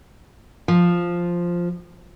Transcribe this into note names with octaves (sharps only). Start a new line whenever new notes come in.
F3